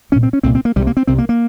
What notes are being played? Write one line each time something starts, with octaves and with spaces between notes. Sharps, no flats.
C2 A#2 C#4
C4
C#4
C2 A#2 C4
C4
A#3
C2 C3 G3
A#3
C4
C2 C3 C4
A#3
A#3